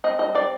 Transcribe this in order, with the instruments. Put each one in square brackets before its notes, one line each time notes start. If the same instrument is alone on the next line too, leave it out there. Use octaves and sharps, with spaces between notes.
[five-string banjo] C4 D#5
G3 D#5
C4 D5